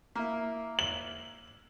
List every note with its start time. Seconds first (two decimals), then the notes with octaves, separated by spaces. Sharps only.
0.15 A#3 E4
0.79 F#7